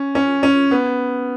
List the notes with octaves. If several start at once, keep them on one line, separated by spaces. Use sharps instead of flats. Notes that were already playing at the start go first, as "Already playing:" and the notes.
Already playing: C#4
C#4
C#4
B3